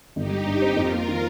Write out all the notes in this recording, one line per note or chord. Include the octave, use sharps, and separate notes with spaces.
G1 D#4 G4
G3
G2
C4
F2 F4 A#4
A#3
D#3